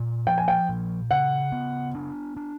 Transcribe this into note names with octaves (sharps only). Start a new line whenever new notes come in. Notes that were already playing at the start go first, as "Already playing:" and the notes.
Already playing: A#2
F3 G5
G#5
G5
A#2
C#3 F#5
B3
D4
D4